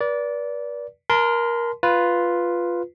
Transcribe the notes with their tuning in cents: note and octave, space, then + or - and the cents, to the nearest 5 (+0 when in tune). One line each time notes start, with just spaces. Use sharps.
B4 -40 D5 -20
A#4 +15 A5 -20 C6 -25
F4 +0 B4 +0